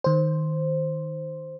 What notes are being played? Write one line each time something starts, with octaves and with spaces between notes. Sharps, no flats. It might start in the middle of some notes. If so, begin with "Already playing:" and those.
D#3 C5